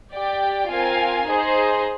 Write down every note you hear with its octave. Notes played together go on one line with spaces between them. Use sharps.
G4 D5 G5
C4 F4 A#4 F5 G#5
D#4 G#4 C5 D#5